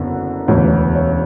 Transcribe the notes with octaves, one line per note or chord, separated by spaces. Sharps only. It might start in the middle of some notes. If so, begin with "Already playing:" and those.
Already playing: F#1 F#2 D3 B3
E1 D2 C#3 E3 B3 C#5
B4
C#5
C#5